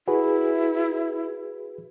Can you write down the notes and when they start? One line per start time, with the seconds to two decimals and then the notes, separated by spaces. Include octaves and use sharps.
0.08 E4 F#4 G#4 B4